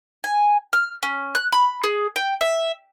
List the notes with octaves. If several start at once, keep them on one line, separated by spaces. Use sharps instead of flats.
G#5
F6
C#4
F#6
B5
G#4
G5
E5